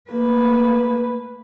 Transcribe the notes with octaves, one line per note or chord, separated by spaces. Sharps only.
A3 A#3 B4